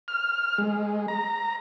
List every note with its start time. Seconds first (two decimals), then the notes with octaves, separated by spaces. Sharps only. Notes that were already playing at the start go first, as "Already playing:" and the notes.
0.08 F6
0.58 G#3
1.08 A#5